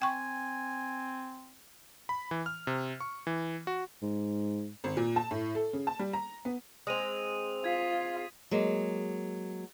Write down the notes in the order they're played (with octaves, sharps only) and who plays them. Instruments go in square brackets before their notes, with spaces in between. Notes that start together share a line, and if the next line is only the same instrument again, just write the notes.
[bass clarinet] C4 [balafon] G5 C#6 [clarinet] G#5
[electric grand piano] B5
E3
F6
C3
C#6
E3
F#4
[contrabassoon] G#2
[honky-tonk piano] G#1
A#2
A5
A2
A4
C#3
A5
G3
A#5
B3
[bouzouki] G#3 C4 [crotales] D#6 D#7 F7
[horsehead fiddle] F4 [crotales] G#6 B6
[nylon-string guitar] F#3 G#3 A#3